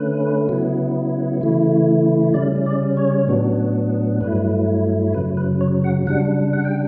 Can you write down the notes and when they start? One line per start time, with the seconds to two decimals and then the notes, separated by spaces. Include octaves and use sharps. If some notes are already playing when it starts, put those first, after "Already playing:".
Already playing: D3 A3 C#4 B4
0.49 C#3 F#3 B3 E4
1.41 C#3 E3 A3 E4
2.34 C#3 G3 C#4 D5
2.66 D5
2.97 C#5
3.27 A2 F#3 B3 D4
4.21 G2 F#3 A3 E4 B4
5.13 F#2 C#3 F#3 B4
5.37 B4
5.61 C#5
5.84 F#5
6.07 C#3 G3 D4 F#5
6.53 F#5
6.65 G5